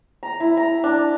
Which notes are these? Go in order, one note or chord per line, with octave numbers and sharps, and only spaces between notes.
A#5
E4
A#5
D4